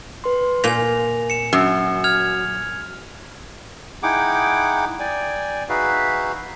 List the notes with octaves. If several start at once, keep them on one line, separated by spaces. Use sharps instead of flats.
B4 C6
A#2 G#5 A#6 F7
C#7 E7
F#2 F#4
F6 G#6 F7
D#4 E4 G#4 F#5 G5 D6
D5 G5 G#5
D#4 F#4 G#4 B4 E5 F5